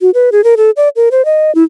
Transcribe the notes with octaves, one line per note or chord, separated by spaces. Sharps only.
F#4
B4
G#4
A#4
A4
D5
A#4
C5
D#5
E4